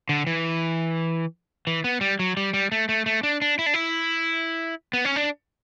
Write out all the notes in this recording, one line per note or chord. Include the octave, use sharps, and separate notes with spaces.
D3
E3
E3
B3
G3
F#3
G3
G3
A3
A3
A3
D4
D4
E4
D4
E4
B3
C#4
D4